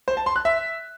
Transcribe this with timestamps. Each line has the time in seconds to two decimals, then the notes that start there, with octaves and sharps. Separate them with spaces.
0.08 C5
0.17 A5
0.26 C6
0.36 F#6
0.45 E5